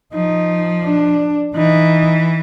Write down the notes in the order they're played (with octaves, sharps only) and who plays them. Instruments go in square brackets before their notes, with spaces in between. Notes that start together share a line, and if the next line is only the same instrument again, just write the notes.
[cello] F3 [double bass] D#4
[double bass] D4
[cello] E3 [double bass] D#4